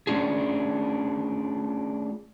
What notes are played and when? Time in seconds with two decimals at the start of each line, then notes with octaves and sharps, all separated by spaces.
0.07 A3 C#4 D4 F4 G#4